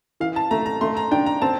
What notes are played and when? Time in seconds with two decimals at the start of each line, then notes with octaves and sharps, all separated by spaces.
0.20 E3 F5
0.36 A5
0.51 A3 A#5
0.66 A#5
0.81 A3 C6
0.97 A#5
1.11 D4 G5
1.26 A#5
1.42 C4 A5